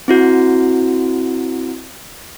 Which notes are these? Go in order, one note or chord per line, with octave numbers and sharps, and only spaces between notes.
C4 E4 F#4